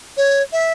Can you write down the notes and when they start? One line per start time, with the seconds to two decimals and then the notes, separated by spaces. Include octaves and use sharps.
0.17 C#5
0.52 E5